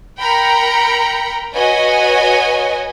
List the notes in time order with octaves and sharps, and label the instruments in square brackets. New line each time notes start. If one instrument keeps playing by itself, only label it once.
[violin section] A#4 G5 A#5 B5 C#7
F#4 B4 C#5 D#5 G#5